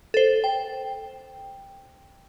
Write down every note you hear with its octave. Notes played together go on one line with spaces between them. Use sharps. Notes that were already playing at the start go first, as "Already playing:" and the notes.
A4 C5
G5